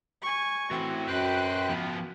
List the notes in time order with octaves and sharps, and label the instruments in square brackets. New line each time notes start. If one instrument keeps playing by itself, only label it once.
[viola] G#5 C#6
[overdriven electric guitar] E3 A3 [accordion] C4 [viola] F#4
[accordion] F#2 G5 F#6 [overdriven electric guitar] B4 C5
[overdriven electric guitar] F3 B3